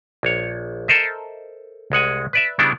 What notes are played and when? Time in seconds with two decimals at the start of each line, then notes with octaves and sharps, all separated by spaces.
0.23 A#1 C#5
0.88 A4 A#4 C5 D#5 E5
1.92 C2 G#3 F#5 G#5
2.33 B4 D5 E5
2.59 C#3 G3 B3 D4 E4